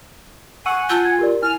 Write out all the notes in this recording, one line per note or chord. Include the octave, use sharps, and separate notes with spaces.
F#5 G#5 C#6 E6 D#7
F4 A5 E6 G6
G#6
G4 A#4 D5
E4 G#5 F6